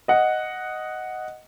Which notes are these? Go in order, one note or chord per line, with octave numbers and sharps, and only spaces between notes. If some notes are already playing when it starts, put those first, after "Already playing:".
D#5 F#5